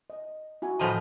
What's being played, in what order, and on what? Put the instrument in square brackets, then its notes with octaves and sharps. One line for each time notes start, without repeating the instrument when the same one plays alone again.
[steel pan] D#5
E4 F#4 G#5
[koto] A2 F3 D#5 [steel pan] A#5 B5